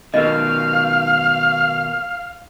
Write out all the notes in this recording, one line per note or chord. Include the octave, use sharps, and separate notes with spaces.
B2 D#3 A#4 D#5 F5